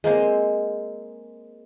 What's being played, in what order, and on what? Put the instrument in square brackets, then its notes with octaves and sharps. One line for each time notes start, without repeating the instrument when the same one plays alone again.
[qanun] G#3 A#3 C4